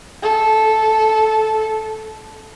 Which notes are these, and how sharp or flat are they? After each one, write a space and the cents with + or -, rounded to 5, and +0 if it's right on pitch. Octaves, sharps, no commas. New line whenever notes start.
A4 -10